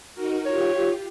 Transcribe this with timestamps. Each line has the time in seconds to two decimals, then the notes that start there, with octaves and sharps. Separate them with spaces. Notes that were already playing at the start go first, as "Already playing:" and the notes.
0.14 D#4 F#4 A#4
0.45 F4 G4 C#5